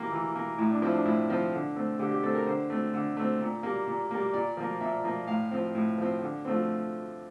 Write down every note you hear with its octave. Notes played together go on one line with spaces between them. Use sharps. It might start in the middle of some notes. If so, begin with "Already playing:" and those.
Already playing: E3 A#3 G4
E3
A#3
A2 E4
D4
F3 C4 E4
D4
A2 E4
F3 C4
D3
A3 C4
D3 G4
G4
A3 C4 A4
A#4
D3 C5
A3 C4
D3
A3 C4
A#2
G3 A#3
A#2
G3 A#3
A#2 D5
F3 A#3
A#2 E5
F3 A#3
A2 F5
F3 C4
A2
F3 C4
D3
F3 A3 C4